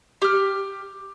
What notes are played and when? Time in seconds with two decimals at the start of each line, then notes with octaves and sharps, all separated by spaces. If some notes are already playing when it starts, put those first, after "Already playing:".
0.22 G4 F6